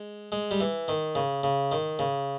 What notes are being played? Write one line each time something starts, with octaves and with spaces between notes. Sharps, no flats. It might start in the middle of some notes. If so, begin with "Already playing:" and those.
Already playing: G#3
G#3
G3
E3
D#3
C#3
C#3
D#3
C#3